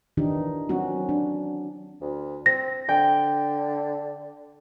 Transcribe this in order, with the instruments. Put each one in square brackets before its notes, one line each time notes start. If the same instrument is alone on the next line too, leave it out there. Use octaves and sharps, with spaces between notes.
[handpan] D#3 E3 D4 D#4 G4
F#3 C4 C#4 F#4
D4
[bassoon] D2
[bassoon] C4 [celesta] A#6
[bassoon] D3 [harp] G5